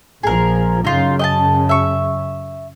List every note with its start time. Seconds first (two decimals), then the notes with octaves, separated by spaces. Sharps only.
0.23 A#1 F3 G#4 A#4
0.85 F#2 C#3 D#4 F4
1.19 D#5 G5 A5
1.69 E5 C#6